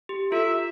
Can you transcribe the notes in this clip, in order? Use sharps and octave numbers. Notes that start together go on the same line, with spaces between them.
G4
F4 A4 E5